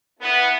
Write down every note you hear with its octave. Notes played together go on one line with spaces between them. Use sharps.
A3 B3 E4 B4